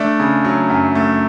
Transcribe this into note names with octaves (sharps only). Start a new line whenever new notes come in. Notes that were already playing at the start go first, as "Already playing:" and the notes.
Already playing: A3 D4
C#3
F#3
F#2
A3